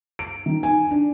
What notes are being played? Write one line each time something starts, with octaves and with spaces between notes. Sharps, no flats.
D7
D#3
G#5
D4